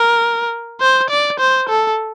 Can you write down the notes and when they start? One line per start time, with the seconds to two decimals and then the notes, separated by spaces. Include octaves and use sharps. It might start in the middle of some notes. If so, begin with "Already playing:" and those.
Already playing: A#4
0.81 C5
1.10 D5
1.40 C5
1.69 A4